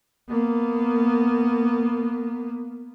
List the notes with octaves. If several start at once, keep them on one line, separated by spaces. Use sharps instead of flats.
A#3 B3